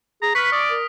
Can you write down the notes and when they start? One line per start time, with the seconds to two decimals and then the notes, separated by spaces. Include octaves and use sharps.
0.22 G#4 A#5
0.35 B4 C#6 F6 B6
0.52 D5 D#6 D7
0.70 A#4